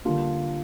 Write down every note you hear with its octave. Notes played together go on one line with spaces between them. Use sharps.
D3 G3 A#3 D4 F4